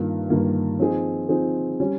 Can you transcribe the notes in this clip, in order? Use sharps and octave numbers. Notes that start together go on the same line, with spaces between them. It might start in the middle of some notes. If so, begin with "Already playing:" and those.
Already playing: G2 D#3 A#3 F4
G2 D#3 A#3 F4
F3 C4 D#4 G#4
F3 C4 D#4 G#4
G3 C#4